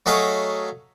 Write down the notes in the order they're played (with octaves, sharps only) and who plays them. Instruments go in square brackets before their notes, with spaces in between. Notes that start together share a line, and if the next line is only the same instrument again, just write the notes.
[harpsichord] F#3 A3 G#4 C#5 D#5 F5